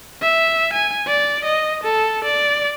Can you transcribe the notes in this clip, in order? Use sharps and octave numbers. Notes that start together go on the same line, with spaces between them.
E5
G#5
D5
D#5
A4
D5